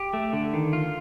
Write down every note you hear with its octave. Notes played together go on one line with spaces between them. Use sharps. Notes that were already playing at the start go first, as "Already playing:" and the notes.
Already playing: G4
A3
D3
D#3
F4